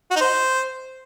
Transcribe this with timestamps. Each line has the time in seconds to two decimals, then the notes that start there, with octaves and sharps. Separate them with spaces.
0.11 F#4
0.16 D#4
0.21 C5